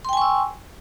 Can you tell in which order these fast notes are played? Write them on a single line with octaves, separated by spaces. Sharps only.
C6 G5 G#5 C#6 E6